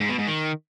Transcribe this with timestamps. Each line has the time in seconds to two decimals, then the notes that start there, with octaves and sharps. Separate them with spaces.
0.01 G#2
0.10 B2
0.19 G#2
0.28 D#3